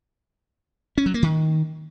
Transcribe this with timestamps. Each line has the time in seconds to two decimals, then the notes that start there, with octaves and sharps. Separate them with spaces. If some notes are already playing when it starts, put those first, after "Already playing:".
0.98 C#4
1.06 F#3
1.14 A#3
1.23 D#3